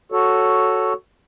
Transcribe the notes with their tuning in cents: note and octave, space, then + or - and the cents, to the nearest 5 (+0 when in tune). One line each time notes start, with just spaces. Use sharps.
F#4 +0 A4 +0 C#5 +0